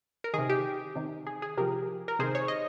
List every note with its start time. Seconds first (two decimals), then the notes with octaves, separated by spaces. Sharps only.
0.24 A#4
0.33 C3 D#3 G#4
0.49 G4
0.96 C3 D#3
1.27 G#4
1.42 G#4
1.57 C3 F3 G4 A#4
2.08 A#4
2.19 C3 D#3 G#4 C5
2.35 C#5
2.48 D#5